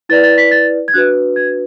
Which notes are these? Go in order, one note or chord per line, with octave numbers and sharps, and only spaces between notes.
E4 B4 D5 A6
A6
B6
A6
G#6
D4 F#4 B4 F#6
G#6